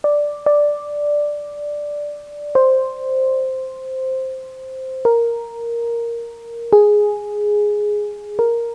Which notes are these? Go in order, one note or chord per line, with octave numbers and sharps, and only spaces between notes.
D5
D5
C5
A#4
G#4
A#4